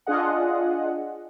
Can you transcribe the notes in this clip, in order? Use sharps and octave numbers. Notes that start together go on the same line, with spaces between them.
D4 F4 G#4 D#5 F#5